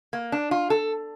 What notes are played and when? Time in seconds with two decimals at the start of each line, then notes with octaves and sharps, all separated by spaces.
0.13 A#3
0.32 D4
0.51 F4
0.70 A4